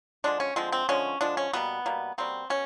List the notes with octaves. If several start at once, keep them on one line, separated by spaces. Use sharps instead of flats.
D3 F3 G#3 D4
C#4
D3 F3 G#3 C4
C4
D3 F3 G#3 C#4
D3 F3 G#3 D4
C#4
B2 G3 A#3 B3
B2 G3 A#3
B2 G3 A#3 C4
B2 C#4